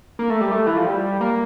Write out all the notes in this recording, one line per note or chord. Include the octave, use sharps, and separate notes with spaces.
A#3
A3
G3
A3
E3
F3
G3
A#3